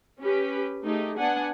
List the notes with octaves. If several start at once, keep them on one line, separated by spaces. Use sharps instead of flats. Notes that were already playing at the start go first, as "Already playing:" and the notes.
C#4 G4 B4
A3 D#4 G4 G#4
B3 D4 F#5 G#5